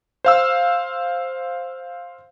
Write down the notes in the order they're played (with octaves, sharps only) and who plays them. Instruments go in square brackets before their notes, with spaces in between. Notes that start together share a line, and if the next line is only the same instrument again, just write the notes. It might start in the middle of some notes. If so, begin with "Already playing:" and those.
[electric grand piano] C5 F5 E6